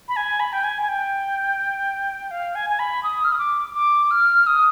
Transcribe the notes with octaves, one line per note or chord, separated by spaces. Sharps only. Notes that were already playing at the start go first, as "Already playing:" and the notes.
B5
G#5
B5
G5
G#5
G#5
G5
F5
G#5
G#5
B5
D#6
F6
D#6
D6
D6
F6
D#6